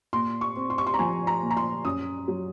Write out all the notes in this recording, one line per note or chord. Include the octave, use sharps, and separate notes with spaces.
A#2 C6
C#6
C4
C6
C#6
C6
A#5
F3 G#5
A#5
A#2
A#5
C6
F#2 D#6
F#3